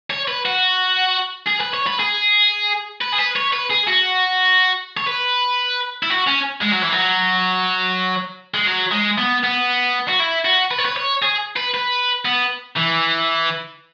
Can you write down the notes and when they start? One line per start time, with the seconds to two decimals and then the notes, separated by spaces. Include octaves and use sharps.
0.10 C#5
0.28 B4
0.45 F#4
1.47 G#4
1.61 B4
1.74 C#5
1.87 B4
1.99 G#4
3.01 B4
3.12 G#4
3.18 B4
3.36 C#5
3.53 B4
3.70 G#4
3.87 F#4
4.97 C#5
5.07 B4
6.03 E4
6.10 F#4
6.27 C#4
6.61 G#3
6.71 F#3
6.82 E3
6.92 F#3
8.54 G#3
8.66 F#3
8.91 G#3
9.18 B3
9.43 B3
10.09 F#4
10.20 E4
10.45 F#4
10.71 B4
10.78 C#5
10.85 B4
10.96 C#5
11.23 G#4
11.56 B4
11.74 B4
12.25 B3
12.76 E3